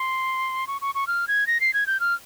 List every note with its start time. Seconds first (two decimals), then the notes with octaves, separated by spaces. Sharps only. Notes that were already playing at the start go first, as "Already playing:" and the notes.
Already playing: C6
0.67 C#6
0.81 C#6
0.95 C#6
1.07 F6
1.28 G#6
1.47 A#6
1.61 C7
1.74 G#6
1.87 G6
2.00 F6